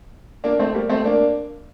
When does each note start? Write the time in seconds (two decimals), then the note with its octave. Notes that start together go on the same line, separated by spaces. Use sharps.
0.44 A#3 D4
0.59 A3 C4
0.74 G3 A#3
0.89 A3 C4
1.05 A#3 D4